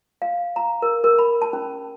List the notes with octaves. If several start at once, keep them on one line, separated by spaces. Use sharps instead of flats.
F5
A#5
A#4
A#4
B5
A5
C#4